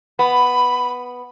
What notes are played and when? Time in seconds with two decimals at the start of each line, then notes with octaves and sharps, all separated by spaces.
0.19 B3 B5